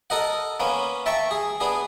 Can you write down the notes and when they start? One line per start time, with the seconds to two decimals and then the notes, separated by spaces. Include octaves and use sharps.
0.10 A4 A#4 D#5 F#5
0.60 A#3 B3 C#4
1.06 E5 G5 A5 A#5 C#6
1.31 G#4
1.60 B3 D4 G#4